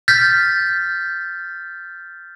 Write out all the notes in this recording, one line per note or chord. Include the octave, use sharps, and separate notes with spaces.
F6 G6 A6 B6